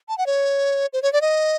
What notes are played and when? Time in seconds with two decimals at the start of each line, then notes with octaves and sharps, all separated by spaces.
0.09 A5
0.18 F#5
0.26 C#5
0.93 C5
1.02 C#5
1.13 D5
1.21 D#5